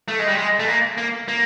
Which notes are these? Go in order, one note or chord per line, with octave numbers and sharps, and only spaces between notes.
A3
G#3
G3
G#3
A3
A#3
A#3
A#3